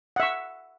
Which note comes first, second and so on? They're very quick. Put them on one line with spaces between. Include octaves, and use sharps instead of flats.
F#5 E5 C#6